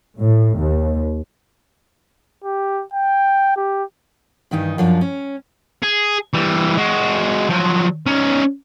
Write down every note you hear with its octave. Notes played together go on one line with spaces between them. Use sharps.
A2
D#2
G4
G5
G4
G2 D#3 E3 D#4
F#2 F3 D4
C#4
G#4
E3 G3
G#3 F#4
F3 F#3
C#4 D#4